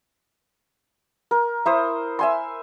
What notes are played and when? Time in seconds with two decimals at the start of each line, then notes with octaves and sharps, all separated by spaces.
1.31 A#4
1.66 E4 C5 D#6
2.19 E5 G#5 C6